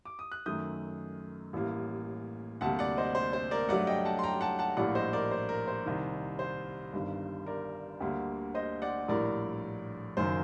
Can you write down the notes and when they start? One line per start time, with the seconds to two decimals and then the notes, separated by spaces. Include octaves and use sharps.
0.05 D6
0.19 D#6
0.32 F#6
0.46 F#2 D#3 A3 D#6 G6
1.53 A1 A2 G3 A#3
2.61 D2 C3 G3 A#3 F#5 A5
2.79 D5 F#5
2.97 C5 D#5
3.15 C5
3.33 C5
3.51 A#4 D5
3.69 G2 F#3 A3 D5 F#5
3.87 D#5 G5
4.05 F#5 A5
4.19 C6
4.23 G5 A#5
4.41 F#5 A5
4.59 F#5 A5
4.77 A#1 A2 G3 A#3 D5 F#5
4.95 C5 D#5
5.13 A#4 D5
5.31 C5
5.49 A#4
5.68 C5
5.86 C2 C3 D#3
6.39 C5
6.93 G1 G2 D#3
7.46 A#4 D5
8.00 D2 D3 G3 A#3
8.55 C5 D#5
8.82 D5 F#5
9.08 A#1 A2 G3 A#4 D5
10.17 F#1 F#2 D#3 C5